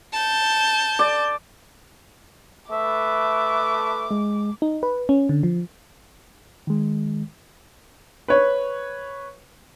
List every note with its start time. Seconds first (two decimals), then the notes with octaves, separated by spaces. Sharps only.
0.13 A5 G6
0.99 D5
2.71 A3 B4 E5 D6
4.11 G#3
4.62 D#4
4.83 B4
5.09 C#4
5.29 D3
5.43 F3
6.67 D#3 G#3
8.28 B4 C#5